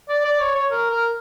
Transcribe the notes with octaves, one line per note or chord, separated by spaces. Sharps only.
D5
D5
C#5
C#5
A#4
A#4